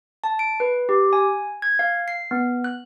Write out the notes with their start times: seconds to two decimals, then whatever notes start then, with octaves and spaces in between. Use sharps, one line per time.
0.24 A5
0.39 D7
0.60 B4
0.89 G4
1.13 G#5
1.62 G#6
1.79 F5
2.08 C7
2.31 B3
2.64 F#6